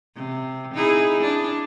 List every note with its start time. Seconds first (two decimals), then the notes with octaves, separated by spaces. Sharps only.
0.16 C3
0.74 D#4 E4 G#4
1.21 D4